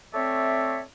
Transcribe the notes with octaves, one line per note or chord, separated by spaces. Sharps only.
A3 C4 C#5 D5 E5